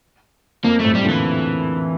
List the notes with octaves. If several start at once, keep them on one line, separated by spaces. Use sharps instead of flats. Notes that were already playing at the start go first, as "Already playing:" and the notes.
F2 A#3
A2 C3 A3
G3
A#2 D3
E3